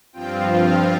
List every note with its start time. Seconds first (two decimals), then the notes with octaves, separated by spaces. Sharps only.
0.13 G2 F3 C4 F4 G5
0.61 F5